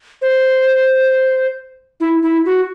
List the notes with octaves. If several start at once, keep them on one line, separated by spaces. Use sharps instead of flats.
C5
E4
E4
F#4